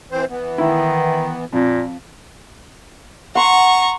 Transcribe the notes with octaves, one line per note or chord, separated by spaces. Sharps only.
E3 C4 C5
E3 B3
D#3 E4
F2 A#2
F#5 A#5 C6 C#6